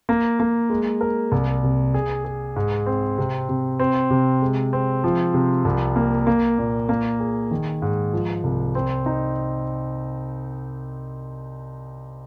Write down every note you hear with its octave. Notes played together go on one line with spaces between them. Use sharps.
A#3
A#3
G#3
A#4
C2
C3
G#4
G#4
G#2
C4
C3
C3
C4
C3
G#3
C4
F3
C3
C2
A#3
A#3
A#2
A#3
G#4
D#3
G#2
F3
C2
C4
D#4